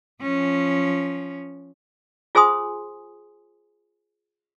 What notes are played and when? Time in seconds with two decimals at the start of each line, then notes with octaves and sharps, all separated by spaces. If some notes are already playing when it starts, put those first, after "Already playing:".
0.22 F3 C#4
2.35 F4 G#4 C5 G#5 C6 D#6